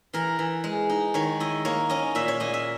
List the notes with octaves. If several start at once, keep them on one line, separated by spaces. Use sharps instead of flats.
E3 A#4
E3
G#3
D#4
D#3 C#5
E4 D#5
A#3 C#5
C#4 D#5
A#2 E5
C#5
A#2 D#5
E5